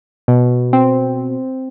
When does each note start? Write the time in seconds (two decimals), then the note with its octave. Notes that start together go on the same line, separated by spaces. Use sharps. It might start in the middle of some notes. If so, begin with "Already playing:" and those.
0.28 B2
0.73 C4